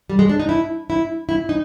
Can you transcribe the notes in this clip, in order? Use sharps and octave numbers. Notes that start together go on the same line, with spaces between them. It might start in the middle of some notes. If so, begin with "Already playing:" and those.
G3
G#3
D4
D#4
E4
E4
E4
D#4